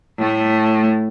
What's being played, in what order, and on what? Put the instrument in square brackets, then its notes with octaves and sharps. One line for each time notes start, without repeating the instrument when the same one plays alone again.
[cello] A2 A3